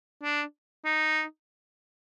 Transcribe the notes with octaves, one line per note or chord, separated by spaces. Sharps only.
D4
D#4